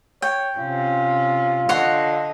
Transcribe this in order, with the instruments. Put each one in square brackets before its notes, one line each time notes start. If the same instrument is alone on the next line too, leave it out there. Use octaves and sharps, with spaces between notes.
[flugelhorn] C#5 [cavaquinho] G5
[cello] C3 C#4 [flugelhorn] F4
[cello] D3 D#5 [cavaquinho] C#5 F#5 C6